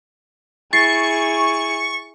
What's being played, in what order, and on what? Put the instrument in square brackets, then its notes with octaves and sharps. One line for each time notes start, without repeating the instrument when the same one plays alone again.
[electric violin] E4 G#4 [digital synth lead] C#6 [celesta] A6 C7